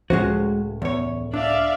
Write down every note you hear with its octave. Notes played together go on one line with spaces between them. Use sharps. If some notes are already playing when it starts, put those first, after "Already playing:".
C#2 A2 F3 G#3 C#4 F#4
E2 C#5
D4 D5 E5 F5